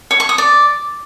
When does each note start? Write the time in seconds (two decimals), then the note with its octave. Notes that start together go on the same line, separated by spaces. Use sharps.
0.11 C#5
0.20 C#6
0.29 D#6
0.38 D5